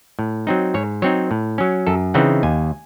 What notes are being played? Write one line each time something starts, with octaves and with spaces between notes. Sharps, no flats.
A2
F#3 C4 D#4
G#2 C#5
F#3 C4 D#4 C#5
A2
F#3 C#4
F#2 A4
C#3 E3 C4 D#4 F#5
D#2 G#5